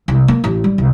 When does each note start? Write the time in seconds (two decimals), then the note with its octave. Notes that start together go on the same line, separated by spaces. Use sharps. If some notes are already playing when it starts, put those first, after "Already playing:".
0.08 C2
0.28 A#3
0.44 A1
0.64 G3
0.78 C2